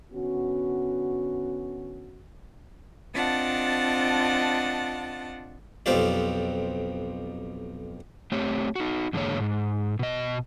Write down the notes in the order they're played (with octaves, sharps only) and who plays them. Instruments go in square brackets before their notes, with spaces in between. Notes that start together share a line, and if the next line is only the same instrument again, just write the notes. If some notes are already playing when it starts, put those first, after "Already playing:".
[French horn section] D3 B3 C#4 F#4
[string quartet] C4 D4 F4 D#5 F#5 A5
[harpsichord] B1 F2 C4 F4 G4 D5
[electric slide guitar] A3 C4 G4 C#5
D#4 F#4
E2 G#2 D3 G#3 A#3 C#5
G#2
B2 D#5